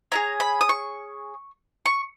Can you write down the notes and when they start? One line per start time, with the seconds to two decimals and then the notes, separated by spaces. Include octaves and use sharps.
0.12 C#4 E4 G#4 A#5
0.40 B5
0.61 D#6
0.69 C#6
1.86 C#6